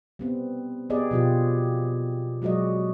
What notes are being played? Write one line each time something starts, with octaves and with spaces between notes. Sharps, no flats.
G3 B3 C4
B3 G4 G#4 D5 D#5
B2 F3 F4 G4
F#3 G#3 F#4 D5 D#5